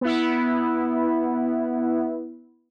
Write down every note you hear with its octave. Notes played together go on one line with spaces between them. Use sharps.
B3 E4